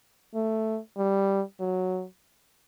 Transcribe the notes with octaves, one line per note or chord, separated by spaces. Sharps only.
A3
G3
F#3